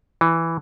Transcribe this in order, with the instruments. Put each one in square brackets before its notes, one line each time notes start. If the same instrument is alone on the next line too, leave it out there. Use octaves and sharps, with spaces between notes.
[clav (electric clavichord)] E3